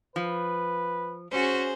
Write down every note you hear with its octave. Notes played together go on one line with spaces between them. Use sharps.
F3 B4
C#4 F#4 G#4 C5